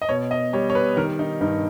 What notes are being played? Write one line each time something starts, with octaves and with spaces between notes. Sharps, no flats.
D#5
B2 C#5
D#5
G3 C#5
C#5
B4
D#3 A#4
D#4
G2 D#4